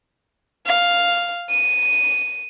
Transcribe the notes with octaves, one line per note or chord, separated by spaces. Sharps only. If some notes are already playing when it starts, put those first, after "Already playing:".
F5
D#7